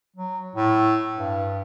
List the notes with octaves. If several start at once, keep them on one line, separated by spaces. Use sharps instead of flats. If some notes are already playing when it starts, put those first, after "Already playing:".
F#3
A2
G2